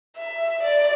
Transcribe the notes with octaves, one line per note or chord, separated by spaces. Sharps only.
E5
D5